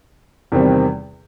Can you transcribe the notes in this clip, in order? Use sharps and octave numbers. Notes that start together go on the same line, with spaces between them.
E2 C3 D#3 G3 C4